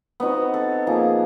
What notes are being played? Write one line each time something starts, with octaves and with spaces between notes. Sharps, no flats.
B3 C4 D#4 F#4
A4
F3 A#3 D#4 G#4